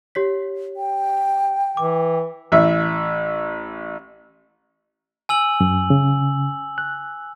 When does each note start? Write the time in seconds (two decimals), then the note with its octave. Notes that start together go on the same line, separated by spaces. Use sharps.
0.15 G4 C#5 B6
0.77 G5
1.77 E3 D6
2.52 A1 E5
5.29 G#5 E6 F#7
5.60 F#2
5.90 C#3
6.78 F#6